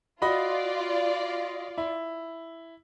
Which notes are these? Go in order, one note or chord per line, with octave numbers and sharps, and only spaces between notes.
F4 F#4 D5 D#5 B5
E4